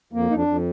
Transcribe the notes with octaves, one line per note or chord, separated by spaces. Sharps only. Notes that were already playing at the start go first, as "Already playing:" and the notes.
F2 A#3
F2 D#4
D4
F2